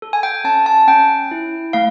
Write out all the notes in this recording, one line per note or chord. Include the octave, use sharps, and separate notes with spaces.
A4
G#5
G5
C#4 A5
A5
C#4 G5
E4
A3 F5